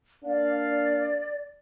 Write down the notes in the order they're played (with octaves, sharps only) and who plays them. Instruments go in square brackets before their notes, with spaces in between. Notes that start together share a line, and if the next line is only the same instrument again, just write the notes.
[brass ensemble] A#3 D4 F5 [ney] D5